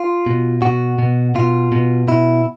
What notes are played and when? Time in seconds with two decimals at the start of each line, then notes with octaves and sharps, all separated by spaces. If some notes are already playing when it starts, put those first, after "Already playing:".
Already playing: F4
0.26 B2
0.62 B2 F#4
0.99 B2
1.35 B2 F4
1.72 B2
2.08 B2 E4